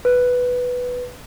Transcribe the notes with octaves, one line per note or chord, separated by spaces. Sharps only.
B4